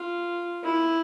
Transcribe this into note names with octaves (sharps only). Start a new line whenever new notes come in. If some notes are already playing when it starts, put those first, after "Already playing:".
Already playing: F4
E4